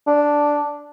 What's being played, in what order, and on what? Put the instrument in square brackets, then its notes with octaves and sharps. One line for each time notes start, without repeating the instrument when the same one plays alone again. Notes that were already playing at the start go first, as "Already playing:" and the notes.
[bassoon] D4